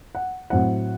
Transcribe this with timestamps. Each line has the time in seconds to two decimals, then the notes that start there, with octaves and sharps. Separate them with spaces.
0.15 F#5
0.50 A2 F#3 C4 E4 F#5